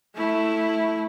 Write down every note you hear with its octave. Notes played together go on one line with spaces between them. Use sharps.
A3 E4